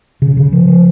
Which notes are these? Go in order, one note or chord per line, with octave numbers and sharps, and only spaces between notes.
C#3
C#3
F3
F3